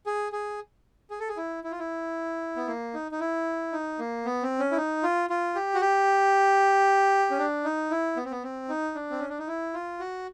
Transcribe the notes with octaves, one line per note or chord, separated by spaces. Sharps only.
G#4
G#4
G#4
A4
G#4
E4
E4
F4
E4
B3
A#3
D#4
D#4
E4
D#4
A#3
B3
C4
C#4
E4
D#4
F4
F4
G4
F#4
G4
C#4
D4
D#4
E4
B3
C4
B3
C4
D#4
D4
C4
C#4
D4
D#4
E4
F4
F#4